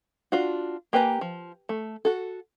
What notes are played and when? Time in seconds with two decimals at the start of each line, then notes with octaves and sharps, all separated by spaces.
0.32 D4 F4 F#4
0.93 A#3 G4 B4 G#5 A#5
1.21 F3
1.69 A3
2.05 F#4 A4